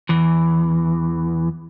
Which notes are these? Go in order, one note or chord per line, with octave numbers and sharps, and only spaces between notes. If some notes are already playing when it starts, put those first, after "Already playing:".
E2 E3